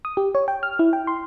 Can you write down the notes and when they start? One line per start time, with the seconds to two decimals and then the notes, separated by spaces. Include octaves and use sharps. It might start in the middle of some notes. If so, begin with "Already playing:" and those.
0.05 D#6
0.17 G4
0.35 C#5
0.48 G5
0.63 F6
0.79 E4
0.93 G5
1.07 C6